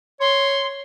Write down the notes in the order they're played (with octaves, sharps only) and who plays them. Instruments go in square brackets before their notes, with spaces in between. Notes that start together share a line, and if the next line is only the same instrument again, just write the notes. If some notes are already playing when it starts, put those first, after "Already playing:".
[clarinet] C#5 [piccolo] C6